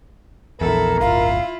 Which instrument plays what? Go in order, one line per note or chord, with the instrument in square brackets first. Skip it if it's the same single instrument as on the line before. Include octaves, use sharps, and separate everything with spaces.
[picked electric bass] A#1 E2 [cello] E4 A4 [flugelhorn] A#4
[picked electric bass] D1 G1 [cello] E4 F4 [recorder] F5